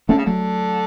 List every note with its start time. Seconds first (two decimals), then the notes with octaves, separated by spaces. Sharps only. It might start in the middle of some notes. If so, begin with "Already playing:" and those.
0.09 D3 A3 C#4
0.18 C#3
0.26 D3 F#3 A3